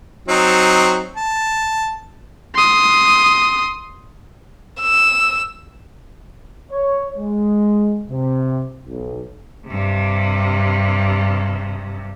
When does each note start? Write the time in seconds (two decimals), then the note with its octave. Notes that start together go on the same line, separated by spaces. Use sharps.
0.28 F#3 C4 D#4
1.16 A5
2.55 C6 D#6
4.81 E6
6.72 C#5
7.17 G#3
8.09 C3
8.86 B1
9.68 G2 C3